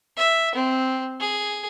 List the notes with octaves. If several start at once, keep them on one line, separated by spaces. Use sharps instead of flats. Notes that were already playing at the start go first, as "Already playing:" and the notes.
E5
C4
G#4